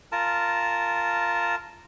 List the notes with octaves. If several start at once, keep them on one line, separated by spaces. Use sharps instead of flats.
F4 A#4 A5